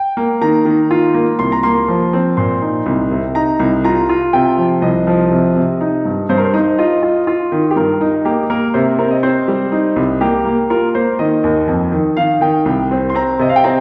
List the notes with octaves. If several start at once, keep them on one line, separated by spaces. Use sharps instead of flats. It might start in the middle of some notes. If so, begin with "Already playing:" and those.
Already playing: G5
A#3
D#3 A#5
D#3
F4
A#3
C2 C6
A#5
A#3 C6
F3
C4
A#2 C6
D#4
C2
C3
D#4 A#5
C2
F4 A#5
F4
C3 G5
F3
C2 D#5
F3
C3
C3
D#4
G2
G2 C5
A#4
C5
D#4
F4 D#5
F4
F4
D#3
G4
G2 A#4
D#4
A#3 G4
A#3 A#4
C3 C5
C4 A#4
D#5
C4 C5
G3
D#4
C2
A#3 G4
A#3
F4 A#4
A#3 C5
D#3 D#5
D#2
F2
D#3
D#3 F5
D#3 G5
C2
C4
C6
C4 A#5
C3 D#5
F5
G5
C4 A#5